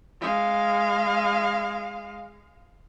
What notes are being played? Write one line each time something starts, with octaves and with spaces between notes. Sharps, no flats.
G#3 F5